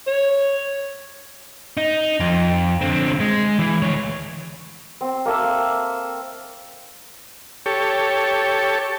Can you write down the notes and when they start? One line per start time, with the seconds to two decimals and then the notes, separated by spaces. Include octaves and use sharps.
0.07 C#5
1.77 D#4
2.20 F2
2.81 D3 C4
3.20 G#3
3.59 E3
3.82 D2 C#5
5.01 C4
5.26 A#3 A4 E5
7.66 G4 A4 C#5